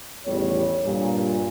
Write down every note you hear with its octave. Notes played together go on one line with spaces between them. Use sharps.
A1 E2 D#3 G3 C#5
G2 A#2